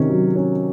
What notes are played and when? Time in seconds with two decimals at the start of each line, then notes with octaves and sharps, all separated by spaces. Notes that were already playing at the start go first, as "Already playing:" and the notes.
Already playing: C3 D#3 C#4
0.10 F#3
0.36 C#4